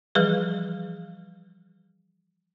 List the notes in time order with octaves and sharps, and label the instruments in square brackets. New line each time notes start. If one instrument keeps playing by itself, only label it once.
[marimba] E3 F3 G3 G#4 B4